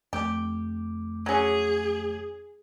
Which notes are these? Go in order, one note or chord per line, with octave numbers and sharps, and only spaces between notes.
F2 A3 G4 D6
F#3 C#4 G#4